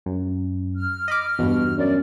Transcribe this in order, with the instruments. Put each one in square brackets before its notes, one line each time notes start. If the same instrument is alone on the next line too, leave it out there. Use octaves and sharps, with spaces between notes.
[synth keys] F#2
[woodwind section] F6
[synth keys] D#5 B5 D6
[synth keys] E2 G2 [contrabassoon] B2
[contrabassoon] F#2 [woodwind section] D5